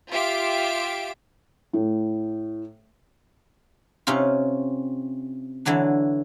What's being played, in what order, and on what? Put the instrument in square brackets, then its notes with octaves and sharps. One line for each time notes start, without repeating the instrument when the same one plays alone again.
[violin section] F4 G4 E5 D6 D7
[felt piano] A2
[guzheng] C3 C#4 D#4 F4
D3 E3 F#3 D4